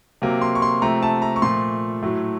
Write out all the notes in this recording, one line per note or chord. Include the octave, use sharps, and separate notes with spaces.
C3 F#3 A#3
C6
C#6
C6
C3 F3 A3 A#5
A5
A#5
C#6
A#2 F3 A3 C6
A2 F#3 A3